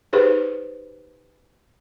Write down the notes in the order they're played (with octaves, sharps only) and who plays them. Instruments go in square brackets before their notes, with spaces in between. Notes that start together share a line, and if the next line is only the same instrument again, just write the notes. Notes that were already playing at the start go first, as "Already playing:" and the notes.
[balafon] D#4 G4 G#4 B4 C5